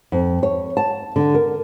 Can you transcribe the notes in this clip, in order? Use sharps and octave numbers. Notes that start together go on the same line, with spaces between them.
F2
C#5
A5
D3
A#4